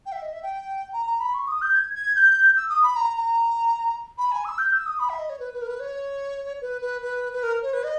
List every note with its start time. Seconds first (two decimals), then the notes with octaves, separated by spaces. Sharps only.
0.06 G5
0.12 E5
0.22 D#5
0.33 E5
0.43 G5
0.93 A#5
1.06 A#5
1.20 B5
1.34 C#6
1.47 D#6
1.61 G6
1.75 G#6
1.94 G#6
2.15 G6
2.56 E6
2.69 D#6
2.83 B5
2.96 A#5
3.17 A#5
4.18 B5
4.31 G#5
4.44 E6
4.58 G6
4.72 E6
4.86 D#6
4.99 B5
5.09 E5
5.19 D#5
5.29 C#5
5.39 B4
5.54 B4
5.61 A#4
5.66 B4
5.80 C#5
6.61 B4
6.81 B4
7.01 B4
7.33 B4
7.43 A#4
7.62 C#5
7.73 B4
7.83 D#5